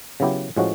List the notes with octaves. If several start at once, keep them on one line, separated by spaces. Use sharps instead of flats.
C#3 F#3 B3 E4 G4
A2 F3 G#3 C#4 F#4